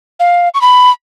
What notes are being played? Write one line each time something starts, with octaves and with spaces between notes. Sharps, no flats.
F5
C#6
B5